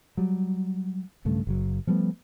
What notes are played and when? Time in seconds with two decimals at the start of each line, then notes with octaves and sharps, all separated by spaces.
0.17 F#3 G3
1.25 B1 G2 C#3 A3
1.47 F#1 F#3
1.87 F3 G3 A3 B3